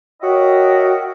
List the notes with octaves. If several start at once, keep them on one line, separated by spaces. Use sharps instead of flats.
F#4 A#4 C#5 D#5 E5 G5